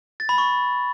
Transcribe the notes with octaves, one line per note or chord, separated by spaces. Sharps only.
A6
B5
C#6